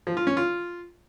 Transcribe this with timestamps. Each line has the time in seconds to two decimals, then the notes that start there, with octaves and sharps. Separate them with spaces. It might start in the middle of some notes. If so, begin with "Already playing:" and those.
0.07 F3
0.17 F4
0.27 C#4
0.37 F4